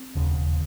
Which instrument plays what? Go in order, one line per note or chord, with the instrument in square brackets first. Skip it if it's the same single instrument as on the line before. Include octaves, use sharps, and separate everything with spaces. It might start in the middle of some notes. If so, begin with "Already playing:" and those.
Already playing: [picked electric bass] C4
E1 D#2 C#3